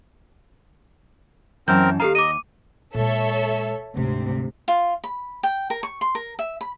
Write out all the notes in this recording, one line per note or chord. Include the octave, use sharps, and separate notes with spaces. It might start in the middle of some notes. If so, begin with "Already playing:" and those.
F#2 E3 C4 A#4 A5 G6
D#2 G4 A4 F5 A#5
D#5 D6 D#7
A#2 G#3 A4 C#5 E5
D2 G#2 C3
F4
B5
G5
A#4
C#6
C6
A#4
E5
B5